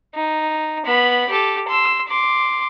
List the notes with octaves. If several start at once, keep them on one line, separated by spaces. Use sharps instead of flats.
D#4
B3 B5
G4 A4
C6 E6
C6 D6